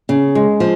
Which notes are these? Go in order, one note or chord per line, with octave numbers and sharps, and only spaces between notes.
C#3
G#3
F3